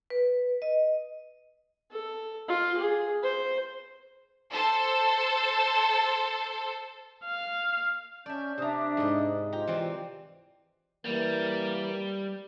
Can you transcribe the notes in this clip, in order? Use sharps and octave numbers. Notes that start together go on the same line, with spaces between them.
B4
D#5
A4
F4
G#4
C5
A4 C5
F5
C#4 D5 E5 A5 G6
C3 D4 E5 A#5 D#6
G#2 D#5
F4 G4 D#5 A#5
E3 C4 D5
E3 G3 A#3